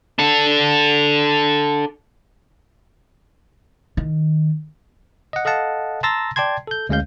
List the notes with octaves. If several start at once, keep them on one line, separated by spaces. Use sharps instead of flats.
D4 A4
D#3
D#5 F#5
A4 D#5 F5 F#5 A5
A5 A#5 C6 E6 A6 A#6
D5 G5 A5 C6 G#6
A4 G6
D2 G#3 C#4 F5 G6